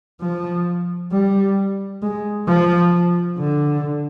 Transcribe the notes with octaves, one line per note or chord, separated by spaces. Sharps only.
F3
G3
G#3
F3
D3